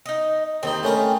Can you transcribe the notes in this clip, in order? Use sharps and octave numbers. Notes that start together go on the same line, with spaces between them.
D#4 D#5
D#2 G3 C4 D#4
A3 C#4 A#4